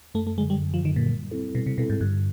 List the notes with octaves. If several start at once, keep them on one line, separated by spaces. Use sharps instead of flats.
F#2 A3
A3
D3 F#3 G#3
G3
F#2
F3
D3 D#3 F#3
A#2
G3
C4 E4 A4
B2 G3
C3
B2 C4 E4 A4
G#2
G2 D3